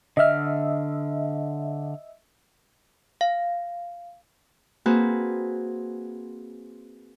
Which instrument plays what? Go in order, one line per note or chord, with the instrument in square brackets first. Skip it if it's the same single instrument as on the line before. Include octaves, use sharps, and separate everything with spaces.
[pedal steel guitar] D3 F6 [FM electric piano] D#5 E5
[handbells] F5
[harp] A#3 C4 F#4 G#4 B4